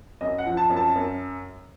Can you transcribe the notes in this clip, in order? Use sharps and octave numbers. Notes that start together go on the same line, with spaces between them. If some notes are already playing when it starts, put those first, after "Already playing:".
F#2 D#5
F#5
F3
A5
F#2
A5
F#2